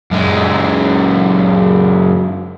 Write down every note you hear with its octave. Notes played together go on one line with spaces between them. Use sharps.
F#2 G#3